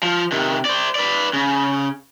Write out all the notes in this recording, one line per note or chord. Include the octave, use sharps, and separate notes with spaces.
F3
C3 D#3
C5 D5
B4 D5
C#3